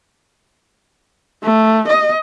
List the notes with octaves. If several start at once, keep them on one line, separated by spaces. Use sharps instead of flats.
A3
D#5